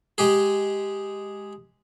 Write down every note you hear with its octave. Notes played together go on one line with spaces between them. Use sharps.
G#3 G4 G#4